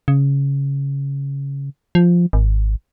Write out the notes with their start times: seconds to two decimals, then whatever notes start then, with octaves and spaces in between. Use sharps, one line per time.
0.08 C#3
1.95 F3
2.33 G#1